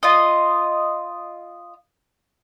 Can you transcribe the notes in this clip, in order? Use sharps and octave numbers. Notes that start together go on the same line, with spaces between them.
F4 D#5